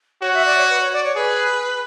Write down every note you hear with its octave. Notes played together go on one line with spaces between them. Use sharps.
F#4 C#5
E5
D5
C#5
B4
C#5
D5
C#5
G#4 B4